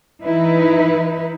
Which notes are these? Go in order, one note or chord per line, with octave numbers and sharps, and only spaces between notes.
E3 D#4 E4 B4